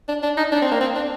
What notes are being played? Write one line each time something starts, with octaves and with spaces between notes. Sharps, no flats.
D4
D4
D#4
D4
C4
A#3
C4
D4